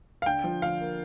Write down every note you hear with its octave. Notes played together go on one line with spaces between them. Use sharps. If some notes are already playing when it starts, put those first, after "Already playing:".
F5
D3 G5
F3
D3 F5
A#3